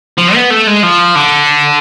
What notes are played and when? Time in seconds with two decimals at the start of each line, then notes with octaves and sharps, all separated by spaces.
0.18 F3
0.35 B3
0.50 A3
0.67 G#3
0.83 F3
1.16 D3